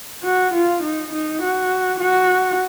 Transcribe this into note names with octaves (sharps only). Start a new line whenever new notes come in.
F#4
F4
D#4
D#4
F#4
F#4